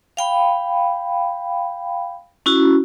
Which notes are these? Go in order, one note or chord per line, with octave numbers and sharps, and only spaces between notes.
F5 G5 B5
C#4 E4 F#4